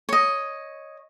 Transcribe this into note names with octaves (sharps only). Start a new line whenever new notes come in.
C#5 D#5